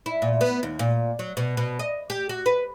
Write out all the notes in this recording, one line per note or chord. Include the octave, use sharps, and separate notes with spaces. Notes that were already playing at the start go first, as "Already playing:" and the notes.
E4
A#2
B3
D#2
A#2
F#3
B2
B2
D#5
G4
F#4
B4